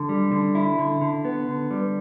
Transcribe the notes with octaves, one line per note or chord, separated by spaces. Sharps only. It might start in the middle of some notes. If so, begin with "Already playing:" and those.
Already playing: D3
G3
D3
E4
D3
D3
B3
D3
G3